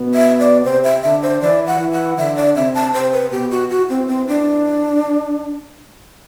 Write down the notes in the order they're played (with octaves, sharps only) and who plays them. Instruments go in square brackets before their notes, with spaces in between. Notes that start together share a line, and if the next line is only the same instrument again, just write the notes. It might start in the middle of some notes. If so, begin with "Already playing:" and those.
Already playing: [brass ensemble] B2 B3
[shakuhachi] E5
D5
[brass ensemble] C3 C4 [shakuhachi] C5
[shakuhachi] E5
[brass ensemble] D3 D4 [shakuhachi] E5
[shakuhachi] C5
[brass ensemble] E3 E4 [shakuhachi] D5
[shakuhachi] F#5
[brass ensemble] E3 E4
[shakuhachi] F#5
[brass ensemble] D3 D4 [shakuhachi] E5
[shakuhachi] D5
[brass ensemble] C3 C4 [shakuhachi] E5
[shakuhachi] A5
[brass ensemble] C3 C4 [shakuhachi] C5
[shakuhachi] B4
[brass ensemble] B2 B3 [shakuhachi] G4
[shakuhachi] F#4
[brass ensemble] E2 E3 [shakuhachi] F#4
[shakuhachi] C4
C4
D4